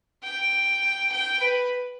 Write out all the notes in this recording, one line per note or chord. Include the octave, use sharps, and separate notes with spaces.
G5
G5
B4